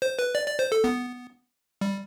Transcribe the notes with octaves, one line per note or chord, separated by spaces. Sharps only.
C5
B4
D5
D5
C5
A4
B3
G3